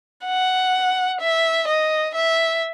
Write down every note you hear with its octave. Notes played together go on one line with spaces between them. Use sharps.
F#5
E5
D#5
E5